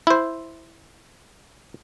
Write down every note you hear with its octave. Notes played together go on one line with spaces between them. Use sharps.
E4 C5